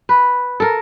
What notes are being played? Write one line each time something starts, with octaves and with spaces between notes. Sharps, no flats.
B4
A4 A#4